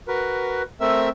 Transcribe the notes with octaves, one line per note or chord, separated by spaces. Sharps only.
F#4 A#4 B4
A3 C4 A#4 E5 E6